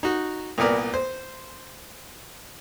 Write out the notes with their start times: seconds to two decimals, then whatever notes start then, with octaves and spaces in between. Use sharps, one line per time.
0.03 D#4 F#4
0.58 C2 A#2 B3 A#4 D5
0.94 C5